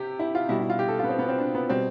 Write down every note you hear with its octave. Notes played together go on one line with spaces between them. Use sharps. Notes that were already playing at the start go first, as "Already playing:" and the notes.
Already playing: C3 G4
E4
F4
B2 G3 E4
E4
F4
G4
A4
F4
B3
C4
B3
C4
D4
B3
B2 G3 C4